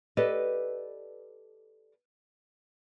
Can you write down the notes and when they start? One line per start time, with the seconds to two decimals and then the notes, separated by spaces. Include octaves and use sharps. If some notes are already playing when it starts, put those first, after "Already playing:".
0.17 G4 A4 B4 D5 D#5